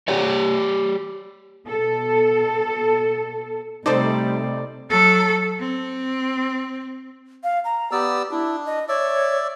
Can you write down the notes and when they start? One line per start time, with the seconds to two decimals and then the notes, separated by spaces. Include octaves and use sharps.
0.08 G4 C#5 D5
1.67 B2 A4
3.86 C3 G3 A3 D#4 A4 C5 D5
4.90 F#3 A4
5.60 C4
7.44 F5
7.64 A#5
7.92 B3 G4 D5 E6
8.31 D4 E4
8.66 D#5
8.88 C#5 D5 E5